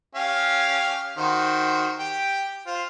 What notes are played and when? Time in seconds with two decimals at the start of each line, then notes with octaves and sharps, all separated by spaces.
0.15 C#4 G4 F5
1.18 D#3 F#4 C5
1.99 G4 G5
2.66 F4 C5